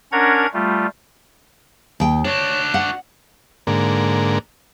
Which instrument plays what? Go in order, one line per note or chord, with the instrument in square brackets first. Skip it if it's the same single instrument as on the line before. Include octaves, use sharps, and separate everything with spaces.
[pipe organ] C#4 D4 A#4 F#5 A#5 G#6
G3 A3 F4
[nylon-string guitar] D#2 G5
[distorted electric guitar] D4 F#4 [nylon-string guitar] C#5
[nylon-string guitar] F#5
[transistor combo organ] G#2 D3 A#3